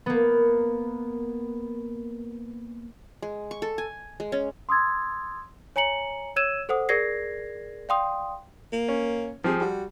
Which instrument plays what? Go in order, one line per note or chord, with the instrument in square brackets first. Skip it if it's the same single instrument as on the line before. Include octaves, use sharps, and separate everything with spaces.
[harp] A#3 B3
[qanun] G#3
C#6
A4
G#5
G#3
C#4
[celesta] C6 D#6 E6 G#6 A6
C#5 G#5 A#5 C#7 F#7
C#5 E6 G#6 D#7 E7
A4 C5 F#5 D#6
G#4 A#4 D5 G#6 A#6 C7
D5 F5 G5 C6 D#6
[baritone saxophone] A#3
[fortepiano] C#4
[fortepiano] F3 G4 G#4 [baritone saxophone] C4
[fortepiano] G3 [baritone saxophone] F#4